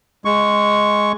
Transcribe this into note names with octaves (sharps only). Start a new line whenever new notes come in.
G#3 C#6